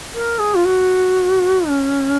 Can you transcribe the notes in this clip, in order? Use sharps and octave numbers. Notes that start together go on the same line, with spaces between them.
A#4
G#4
F4
F#4
C#4